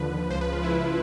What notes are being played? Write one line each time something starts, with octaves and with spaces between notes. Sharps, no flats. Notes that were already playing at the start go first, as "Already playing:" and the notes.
Already playing: D#2 D3 F3 B4
C#2 C#3 F3 C5
B4
F4
E4